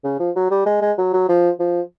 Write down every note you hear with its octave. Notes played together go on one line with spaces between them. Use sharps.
C#3
F3
F#3
G3
G#3
G#3
F#3
F#3
F3
F3